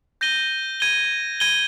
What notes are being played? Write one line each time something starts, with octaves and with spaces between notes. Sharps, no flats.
G6 A#6 D#7 G7
G#6 D#7 G7
G#6 D#7 G7